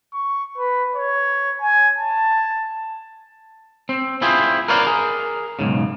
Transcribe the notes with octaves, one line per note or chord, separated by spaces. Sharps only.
C#6
B4
C#5
G#5
A5
C4
C4 E4 F4 G#4 C5
A#4 B4 C#5 D5 F5
G#4 A#4
B1 F2 G#2 C#3